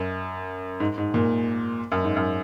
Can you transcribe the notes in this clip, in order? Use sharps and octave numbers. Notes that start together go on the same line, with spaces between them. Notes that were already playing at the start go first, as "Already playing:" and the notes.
Already playing: F#2
G#2
G#2
A#2
F#2
G#2
F#2